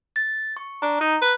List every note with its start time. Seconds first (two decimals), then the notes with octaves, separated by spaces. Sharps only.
0.16 A6
0.57 C#6
0.82 D4 A#5
1.01 D#4
1.21 B4